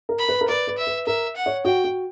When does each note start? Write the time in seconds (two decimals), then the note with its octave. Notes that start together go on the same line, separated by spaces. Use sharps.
0.09 A#4
0.19 B5
0.29 B4
0.41 A#4
0.48 B4 D5
0.67 B4
0.78 E5
0.87 B4
1.07 A#4 E5
1.36 F#5
1.46 C#5
1.65 F#4 G5
1.84 F#4